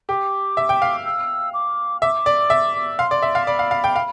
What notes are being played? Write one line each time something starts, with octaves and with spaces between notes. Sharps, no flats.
G4 D6
E5
G5
F5
E6
D6
E5 D6
D5
E5
F5 C6
D5
E5
F5
D5 B5
F5
F5
G5
F5